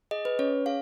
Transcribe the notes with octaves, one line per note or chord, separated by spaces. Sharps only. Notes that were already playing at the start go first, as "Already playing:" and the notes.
G#4 D#5
B4
C#4 C#5
G#4 F5